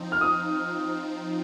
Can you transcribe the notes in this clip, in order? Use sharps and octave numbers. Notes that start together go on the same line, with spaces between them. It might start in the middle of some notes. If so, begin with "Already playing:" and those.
Already playing: F3 C4 D#4
F6
D#6